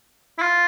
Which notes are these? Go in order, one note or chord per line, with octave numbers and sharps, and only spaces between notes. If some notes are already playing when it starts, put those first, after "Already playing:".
E4
F4